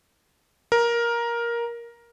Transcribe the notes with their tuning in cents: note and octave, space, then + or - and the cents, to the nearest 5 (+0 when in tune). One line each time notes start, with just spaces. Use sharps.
A#4 +10